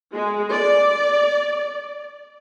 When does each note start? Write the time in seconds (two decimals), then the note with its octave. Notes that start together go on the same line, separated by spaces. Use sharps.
0.13 G#3
0.51 D5